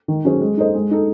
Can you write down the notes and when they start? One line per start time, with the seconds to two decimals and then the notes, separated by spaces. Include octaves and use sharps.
0.08 D#3
0.25 F#3 C#4 G#4 C5
0.41 G#3
0.57 D#4 A4 C5 D#5
0.74 G#3
0.91 D#4 A4